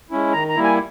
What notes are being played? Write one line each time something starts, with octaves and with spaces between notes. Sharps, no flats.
G#3 C#4 E4
D#3 A#5
A#5
G3 A#3 E4
G#5